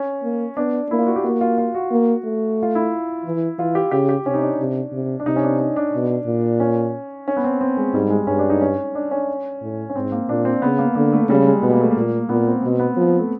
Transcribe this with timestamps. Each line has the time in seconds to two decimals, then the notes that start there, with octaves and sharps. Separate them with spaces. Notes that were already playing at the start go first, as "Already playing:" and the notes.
Already playing: C#4
0.23 A#3
0.57 B3 D4
0.90 A#3 E4
0.99 F4
1.07 F#4
1.16 G4
1.23 A#3 F#4
1.41 F4
1.58 F4
1.75 F#4
1.91 A#3
2.25 A3
2.63 F4
2.75 E4
3.25 E3
3.59 E3 F4
3.75 G4
3.91 C#3 G4
4.09 G4
4.26 C3 C#4
4.34 D#4
4.42 D4
4.59 C3
4.92 C3
5.20 D4
5.25 C3 D#4
5.36 C#4
5.43 D4
5.59 D#4
5.76 D4
5.94 B2
6.26 A#2
6.60 C#4
7.28 C#4
7.37 B3
7.44 C4
7.61 C4
7.77 G#3
7.94 G#2 G3
8.10 G#3
8.27 G2 C#4
8.39 D4
8.50 D#4
8.61 C#4
8.95 D4
9.11 C#4
9.62 A2
9.90 C#4
9.96 G#2 C4
10.12 A#3
10.29 A#2 D4
10.45 C4
10.62 C#3 B3
10.79 A#3
10.95 D3 A#3
11.13 A3
11.29 C#3 G3
11.46 G#3
11.62 B2 B3
11.72 A#3
11.81 A3
11.91 A#3
11.97 A#2
12.29 A#2 B3
12.47 C4
12.63 B2 C4
12.79 B3
12.97 F3
13.19 A3